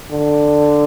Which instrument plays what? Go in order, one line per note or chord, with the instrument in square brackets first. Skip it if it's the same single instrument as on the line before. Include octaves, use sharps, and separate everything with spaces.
[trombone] D3